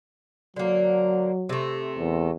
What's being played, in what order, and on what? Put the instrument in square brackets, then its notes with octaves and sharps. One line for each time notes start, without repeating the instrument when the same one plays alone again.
[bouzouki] D3 A#3 [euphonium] F#3
[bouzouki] C3 A3
[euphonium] E2